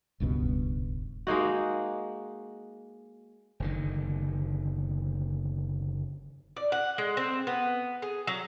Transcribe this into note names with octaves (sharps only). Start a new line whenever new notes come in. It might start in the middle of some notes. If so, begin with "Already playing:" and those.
D#1 C#2 G2 B2
G#3 A#3 D#4 F#4
F#1 D3 D#3
D5
F#5
G#3
C4
B3
G#4
F#3